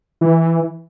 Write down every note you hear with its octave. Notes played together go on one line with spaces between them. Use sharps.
E3